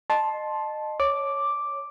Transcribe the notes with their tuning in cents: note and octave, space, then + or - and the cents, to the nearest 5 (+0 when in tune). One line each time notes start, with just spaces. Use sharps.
D#5 -25 A5 -10 C6 +10
C#5 +0 D6 +0